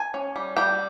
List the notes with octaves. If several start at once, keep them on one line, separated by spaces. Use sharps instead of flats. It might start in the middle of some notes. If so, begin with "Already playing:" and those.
Already playing: G#5
C#4
G3
G3 G5